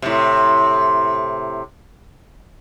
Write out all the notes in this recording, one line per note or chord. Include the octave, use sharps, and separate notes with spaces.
A2 C3